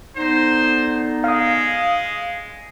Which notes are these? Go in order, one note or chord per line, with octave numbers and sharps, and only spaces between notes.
D3 B3 D#4 C5
G#3 F5 D#6